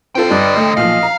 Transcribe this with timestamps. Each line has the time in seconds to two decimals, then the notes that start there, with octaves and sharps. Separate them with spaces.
0.15 D3 C4 F4 A4 G5
0.30 G2 B4 D5 D#5
0.56 A3 D#5
0.77 B1 A#2 F3 F5
1.03 A#5